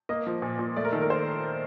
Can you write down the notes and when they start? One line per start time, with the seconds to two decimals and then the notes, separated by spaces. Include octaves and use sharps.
0.09 A#3 D#5
0.27 F3
0.42 A#2
0.59 A#2
0.76 A3 D5
0.85 A#4
0.92 D#3 A4
1.02 A#4
1.10 C5